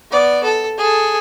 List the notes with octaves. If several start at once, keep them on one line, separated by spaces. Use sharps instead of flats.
B3 D5
A4
G#4 A4